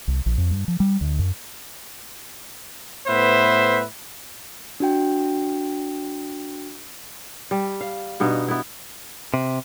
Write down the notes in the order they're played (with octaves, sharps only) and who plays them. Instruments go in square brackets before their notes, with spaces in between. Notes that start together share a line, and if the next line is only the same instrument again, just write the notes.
[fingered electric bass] C2
A#1
F2
G2
F3
G3
D2
F#2
[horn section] A2 B3 B4 C5 E5
[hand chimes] D4 F#4 G5
[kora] G3
F5
G2 B2 B3 D#4
B3 E4
[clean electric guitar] C3